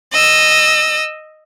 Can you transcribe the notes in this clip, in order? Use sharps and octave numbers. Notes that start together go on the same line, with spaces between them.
D#5 E6